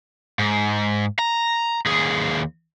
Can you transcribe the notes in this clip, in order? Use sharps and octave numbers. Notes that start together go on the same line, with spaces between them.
G#2
A#5
D#2 G#4